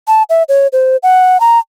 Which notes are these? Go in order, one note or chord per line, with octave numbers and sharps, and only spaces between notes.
A5
E5
C#5
C5
F#5
A#5